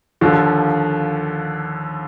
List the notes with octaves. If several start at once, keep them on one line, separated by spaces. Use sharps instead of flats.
D#2 D3 F3